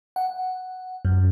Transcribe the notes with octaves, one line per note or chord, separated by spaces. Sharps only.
F#5
F#2